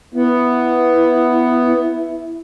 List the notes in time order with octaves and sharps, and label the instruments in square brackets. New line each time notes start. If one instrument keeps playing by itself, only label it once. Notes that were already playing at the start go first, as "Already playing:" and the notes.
[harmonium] B3 [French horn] E4